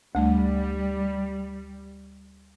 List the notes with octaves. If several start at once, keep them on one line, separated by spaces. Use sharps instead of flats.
D2 G3 A3